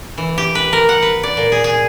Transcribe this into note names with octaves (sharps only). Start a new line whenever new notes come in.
E3
G4
B4
A#4
F#5
B4
D5
A#2
G#4
G#4